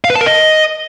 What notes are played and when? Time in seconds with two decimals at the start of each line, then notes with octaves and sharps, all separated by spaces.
0.04 F5
0.10 B4
0.15 A5
0.21 A#4
0.26 D#5